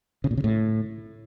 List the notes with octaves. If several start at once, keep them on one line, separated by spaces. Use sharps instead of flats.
C#3
A#2
C#3
A2